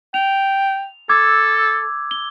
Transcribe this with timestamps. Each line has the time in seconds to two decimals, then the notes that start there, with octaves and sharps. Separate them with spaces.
0.14 G5 F7
1.09 A4 D6 E6 G#6
2.11 G7